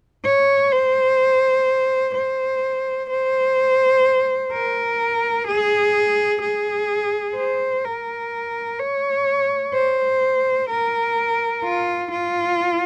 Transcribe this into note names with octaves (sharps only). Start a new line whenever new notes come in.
C#5
C5
C5
C5
A#4
G#4
G#4
C5
A#4
C#5
C5
A#4
F4
F4